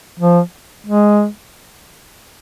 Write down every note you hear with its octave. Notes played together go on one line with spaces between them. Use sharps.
F3
G#3